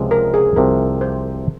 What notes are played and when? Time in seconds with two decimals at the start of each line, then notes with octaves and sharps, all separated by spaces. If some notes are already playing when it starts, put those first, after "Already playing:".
Already playing: C#2 C3 F3 G#3
0.11 A#4
0.34 G#4
0.56 C2 C3 F3 A#4
1.01 C5